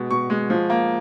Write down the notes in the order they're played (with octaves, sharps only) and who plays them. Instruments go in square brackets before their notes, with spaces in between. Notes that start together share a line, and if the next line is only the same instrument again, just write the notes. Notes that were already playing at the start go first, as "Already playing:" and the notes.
Already playing: [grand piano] B2 G#3
B2 C#6
G#3
F3
A#3